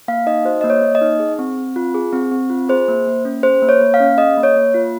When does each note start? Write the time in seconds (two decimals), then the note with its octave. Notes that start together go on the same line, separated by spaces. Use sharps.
0.08 A#3 F5
0.26 D#4 D#5
0.45 F#4 C5
0.61 A#3 D#5
0.70 C#5
0.82 A#3
0.95 D#5
1.02 D#4
1.20 G#4
1.39 C4
1.57 C4
1.76 F4
1.94 G#4
2.13 C4
2.31 C4
2.50 F4
2.69 G#4 C5
2.88 A#3
3.07 A#3
3.25 C#4
3.43 G#4 C5
3.62 A#3
3.69 C#5
3.81 A#3
3.94 F5
4.00 C#4
4.18 G#4 D#5
4.37 A#3
4.43 C#5
4.56 A#3
4.74 F4